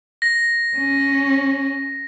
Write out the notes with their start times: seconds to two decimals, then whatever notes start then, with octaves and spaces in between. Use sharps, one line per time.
0.22 A#6
0.76 C#4